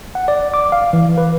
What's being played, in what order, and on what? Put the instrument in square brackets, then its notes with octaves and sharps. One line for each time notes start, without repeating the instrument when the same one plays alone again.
[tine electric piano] F#5
D5
D6
F5
E3
B4